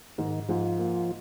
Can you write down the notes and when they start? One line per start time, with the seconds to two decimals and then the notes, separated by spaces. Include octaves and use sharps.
0.18 G#2 D#3
0.49 G#2 F3
0.79 A#3